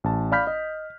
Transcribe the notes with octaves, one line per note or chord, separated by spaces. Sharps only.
A1 A5
D5 F5 B5 F6 G6 B6
D#5